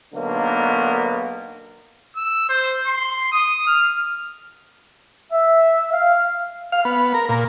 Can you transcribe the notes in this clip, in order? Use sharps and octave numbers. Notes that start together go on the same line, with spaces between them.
B1 D3 A#3 B3 D#4
E6
C5
C6
D#6
F6
E5
F5
F5
B3
A#4
A#2